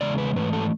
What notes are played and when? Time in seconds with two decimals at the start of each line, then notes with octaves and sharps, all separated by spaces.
0.01 E2 C#3 G#3 D5
0.18 B4
0.36 G#2 E3 A3 B4
0.53 A4